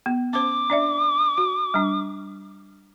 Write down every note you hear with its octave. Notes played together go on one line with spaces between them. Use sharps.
B3
C#4 C5 D6
D4 D5 E5
F#4
G3 D4